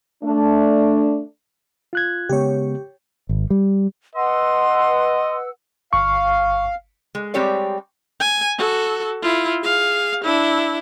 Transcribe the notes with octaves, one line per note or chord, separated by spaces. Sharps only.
A3 D4
F4 F#6 G#6
C#3 G#3 B3 G4 C#5
G#1
G3
B4 D#5 F#5 C6 E6
G1 F5 C#6
G#3
G3 G#3 C4 G4 C#5 D5
G#5
F#4 A4
E4 F4
G#4 F5
D4 E4